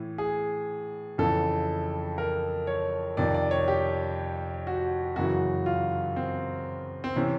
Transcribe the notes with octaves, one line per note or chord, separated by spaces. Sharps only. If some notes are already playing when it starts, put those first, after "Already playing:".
Already playing: A2 E3
G#4
F2 C#3 E3 A4
A#4
C#5
F2 C3 D#3 D5
D5
C#5
G4
F#4
F#2 C#3 E3 F#4
F4
C4
C4
C3 E3 C#4